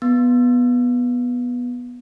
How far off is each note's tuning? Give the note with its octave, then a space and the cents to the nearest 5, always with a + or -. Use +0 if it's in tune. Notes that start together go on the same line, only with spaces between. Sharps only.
B3 -10